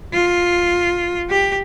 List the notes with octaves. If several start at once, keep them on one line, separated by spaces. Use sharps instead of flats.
F4
G4